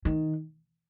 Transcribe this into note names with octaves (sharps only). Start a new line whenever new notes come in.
D#3